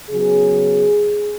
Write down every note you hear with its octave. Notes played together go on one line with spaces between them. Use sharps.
C#3 F#3 B3 G#4